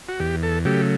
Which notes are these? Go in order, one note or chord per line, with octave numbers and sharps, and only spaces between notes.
F#4
E2 G4
A4
C#3 F#3 A3 G4